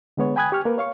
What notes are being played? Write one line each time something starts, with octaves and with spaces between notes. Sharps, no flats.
D3 G#3 B3 C#5
G5 G#5 B5 D#6 F#6 G#6
G4 C#6 F6
A#3 A#4 B4
C#5 F5 C#6